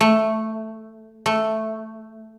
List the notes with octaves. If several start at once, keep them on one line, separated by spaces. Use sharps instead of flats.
A3
A3